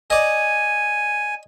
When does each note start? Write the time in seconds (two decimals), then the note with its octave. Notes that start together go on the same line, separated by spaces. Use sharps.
0.10 D5 D#5 G#5